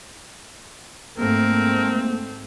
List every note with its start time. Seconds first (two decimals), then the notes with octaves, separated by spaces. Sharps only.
1.18 G#2 A3 A#3 C4 A#4